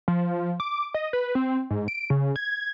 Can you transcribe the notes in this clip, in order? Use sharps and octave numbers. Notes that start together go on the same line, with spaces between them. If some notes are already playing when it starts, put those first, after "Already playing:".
F3
D6
D#5
B4
C4
G#2
D7
C#3
G#6